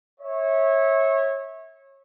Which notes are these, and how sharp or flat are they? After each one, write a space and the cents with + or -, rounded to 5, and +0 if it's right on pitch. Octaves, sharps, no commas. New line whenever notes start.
C#5 -25 E5 -20